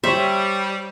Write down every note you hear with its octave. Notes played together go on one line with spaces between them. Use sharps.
G3 C5 C#5 E5